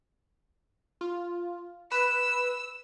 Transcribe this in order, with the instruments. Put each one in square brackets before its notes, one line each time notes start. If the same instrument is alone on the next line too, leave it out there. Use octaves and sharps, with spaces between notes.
[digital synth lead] F4
[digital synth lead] B4 [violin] E6